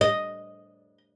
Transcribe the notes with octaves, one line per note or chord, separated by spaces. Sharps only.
D#5